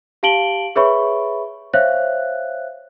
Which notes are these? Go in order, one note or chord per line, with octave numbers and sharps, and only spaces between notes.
G4 F5 A5 D7 F#7 G7
G#4 B4 C#5 E5 B5 C#6
C5 C#5 E5 F5 F#6